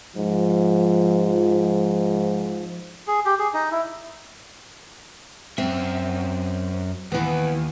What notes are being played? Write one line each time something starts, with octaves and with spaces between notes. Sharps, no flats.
G#2 F3
G#4
G4
G#4
D#4
E4
F#2 C4 E5
D#2 E3 B3